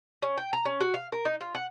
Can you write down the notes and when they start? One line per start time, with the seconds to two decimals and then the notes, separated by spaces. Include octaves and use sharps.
0.22 C#4
0.38 G5
0.53 A#5
0.65 C#4
0.80 F#4
0.94 F5
1.12 A#4
1.25 D#4
1.41 F4
1.55 F#5